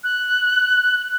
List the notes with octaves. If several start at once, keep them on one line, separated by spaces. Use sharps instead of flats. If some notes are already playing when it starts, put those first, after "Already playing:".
F#6